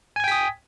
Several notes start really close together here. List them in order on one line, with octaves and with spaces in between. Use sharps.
G#5 G#6 G5 B6 D#6